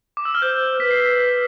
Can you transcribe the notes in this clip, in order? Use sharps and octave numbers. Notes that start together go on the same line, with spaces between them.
D6
E6
F6
C5 G6
B4 B6
C7
B6